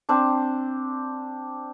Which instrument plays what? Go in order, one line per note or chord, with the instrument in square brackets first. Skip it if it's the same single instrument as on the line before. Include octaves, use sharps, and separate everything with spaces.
[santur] C4 D4